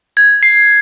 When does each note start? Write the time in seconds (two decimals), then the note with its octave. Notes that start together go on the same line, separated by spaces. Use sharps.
0.17 G#6
0.43 C7